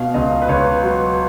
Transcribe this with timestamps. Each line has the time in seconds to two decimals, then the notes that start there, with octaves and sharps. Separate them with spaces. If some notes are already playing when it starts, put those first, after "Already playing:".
Already playing: B2 F5
0.14 C#2 D#5
0.42 B4
0.49 C#2 C#5
0.83 F#3